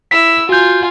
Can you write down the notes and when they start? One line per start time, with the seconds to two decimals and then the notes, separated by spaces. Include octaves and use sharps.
0.11 E4 E6 B6
0.49 F4 F#4 G#5 G6